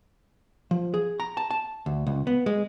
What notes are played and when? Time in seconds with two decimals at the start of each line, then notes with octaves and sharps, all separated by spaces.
0.71 F3
0.94 G#4
1.20 A#5
1.37 A5
1.51 A5
1.86 D2
2.07 C#2
2.27 B3
2.46 G#3